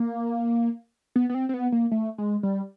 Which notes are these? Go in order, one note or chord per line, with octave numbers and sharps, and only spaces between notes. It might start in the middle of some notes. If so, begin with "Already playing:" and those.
Already playing: A#3
B3
B3
C4
C4
B3
A#3
A3
G#3
G3